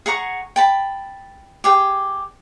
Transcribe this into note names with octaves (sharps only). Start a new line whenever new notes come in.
G#4 F#5 A#5 C#6
G5 A5 B5
G4 G#4 G5